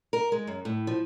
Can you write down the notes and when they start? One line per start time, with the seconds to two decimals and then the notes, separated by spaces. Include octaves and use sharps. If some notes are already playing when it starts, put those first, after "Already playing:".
0.13 A#4
0.32 G#3
0.47 F#2
0.65 A2
0.87 F3